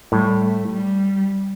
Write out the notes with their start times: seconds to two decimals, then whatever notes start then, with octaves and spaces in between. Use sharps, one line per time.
0.12 A2 G3
0.41 A3
0.70 G3